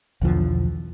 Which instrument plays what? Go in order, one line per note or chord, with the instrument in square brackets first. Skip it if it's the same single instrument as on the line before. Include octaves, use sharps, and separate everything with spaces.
[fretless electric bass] B1 E2 D3 F3